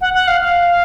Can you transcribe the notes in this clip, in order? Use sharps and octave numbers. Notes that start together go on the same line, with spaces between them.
F#5
F#5
F5
F5